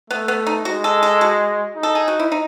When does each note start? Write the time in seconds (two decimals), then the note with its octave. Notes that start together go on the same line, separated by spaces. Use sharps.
0.10 A3 B3
0.28 B3
0.46 D#4
0.65 G#3 F#4
0.84 A4
1.03 A4
1.21 F#4
1.77 D#4
1.83 A4
1.95 G#4
2.08 F#4
2.19 E4
2.32 D#4